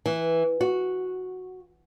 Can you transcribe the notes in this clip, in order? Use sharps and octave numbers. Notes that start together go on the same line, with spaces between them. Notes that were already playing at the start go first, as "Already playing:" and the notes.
E3
F#4